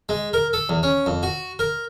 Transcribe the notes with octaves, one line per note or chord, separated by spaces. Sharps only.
G#3
A#4
A4
E2
C#4
F2
F#4
A#4